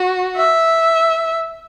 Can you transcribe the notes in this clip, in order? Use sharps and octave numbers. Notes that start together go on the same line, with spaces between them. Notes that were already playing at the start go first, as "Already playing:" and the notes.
Already playing: F#4
E5